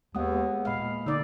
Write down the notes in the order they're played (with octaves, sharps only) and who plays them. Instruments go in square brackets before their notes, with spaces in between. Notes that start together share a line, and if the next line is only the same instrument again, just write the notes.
[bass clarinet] D#2 [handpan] G#3 B3 [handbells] D#5 F#5 D#6
[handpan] A#2 F5 [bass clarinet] G#3 [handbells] B5 F6
[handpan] D3 D5 [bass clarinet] D#4 [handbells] E6